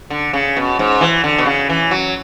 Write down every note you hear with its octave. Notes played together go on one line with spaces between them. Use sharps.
D3
C#3
B2
G#2
E3
D3
B2
C#3
E3
F#3